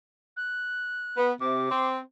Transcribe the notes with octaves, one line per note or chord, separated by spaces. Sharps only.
F#6
B3
C3 D6
C4